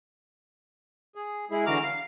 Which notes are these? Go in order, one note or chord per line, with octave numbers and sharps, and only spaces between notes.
G#4
G#3 E4 G#4
D3 E3 F#4 A#5 D6 F6
F5